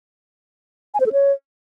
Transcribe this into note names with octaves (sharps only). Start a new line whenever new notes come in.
G#5
C5
A4
C#5